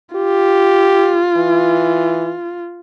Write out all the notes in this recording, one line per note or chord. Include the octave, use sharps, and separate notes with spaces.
F4 G4
E3